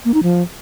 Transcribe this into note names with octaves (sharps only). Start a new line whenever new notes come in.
A#3
D#4
F3